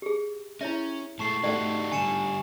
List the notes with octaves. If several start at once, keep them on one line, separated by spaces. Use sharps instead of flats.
G4 G#4
C#4 E4 C#5 E5
A2 G#3 A4 A5 C#6 C7
G#2 A3 D4 D#4 F#4 G4 D5 G5
D3 G3 G#5 C#7 E7